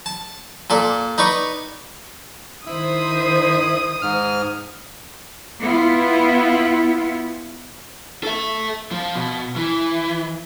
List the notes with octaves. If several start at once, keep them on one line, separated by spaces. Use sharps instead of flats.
A5
A#2 A4 D5
D#4 B4 D5 C#6
D#3 E4 C5 D#6
G#2 F6
B3 E4 F4
A4 E5
F3
B2
E3